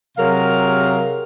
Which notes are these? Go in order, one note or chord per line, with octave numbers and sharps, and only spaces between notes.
C3 F#3 G#4 A#4 F5